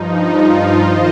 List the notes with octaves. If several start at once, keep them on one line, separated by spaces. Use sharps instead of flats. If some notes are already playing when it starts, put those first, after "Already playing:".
Already playing: G2 F3 D#4
F4
D#3 C5 D#5